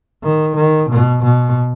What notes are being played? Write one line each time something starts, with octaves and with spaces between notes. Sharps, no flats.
D#3
D#3
B2
B2